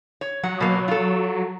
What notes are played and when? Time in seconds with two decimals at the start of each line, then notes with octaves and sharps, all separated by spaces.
0.21 C#5
0.43 F#3 F#5
0.60 B2 A#3
0.88 F4 A4